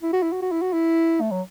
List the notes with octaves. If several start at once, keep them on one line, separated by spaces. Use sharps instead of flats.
E4
F#4
E4
F#4
F#4
E4
F#4
E4
A3
F#3